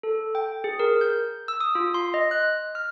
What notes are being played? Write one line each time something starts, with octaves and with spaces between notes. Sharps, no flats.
A4
G5
G#4
A#4
G6
E6
D#6
F4
C6
D#5
F#6
F6